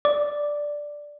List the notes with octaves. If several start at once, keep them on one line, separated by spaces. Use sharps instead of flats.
D5